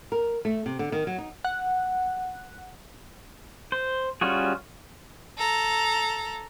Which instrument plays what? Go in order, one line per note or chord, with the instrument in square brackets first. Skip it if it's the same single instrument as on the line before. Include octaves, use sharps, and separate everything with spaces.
[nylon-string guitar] A#4
A3
C3
D3
D#3
F#3
D#4
[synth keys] F#5
[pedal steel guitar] C5
G3 C#4 F4 F#4 G#4
[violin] A4 A#5